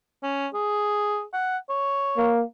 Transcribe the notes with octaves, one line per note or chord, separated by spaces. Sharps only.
C#4
G#4
F#5
C#5
A#3